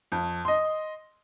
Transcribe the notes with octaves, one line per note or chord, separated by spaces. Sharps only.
F2
D#5 C6